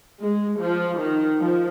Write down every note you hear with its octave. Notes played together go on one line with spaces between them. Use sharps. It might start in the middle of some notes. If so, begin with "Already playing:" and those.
G#3
F3
D#3
F3